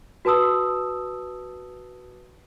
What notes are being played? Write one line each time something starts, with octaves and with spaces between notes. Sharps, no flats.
F#4 B4 A5 D#6 E6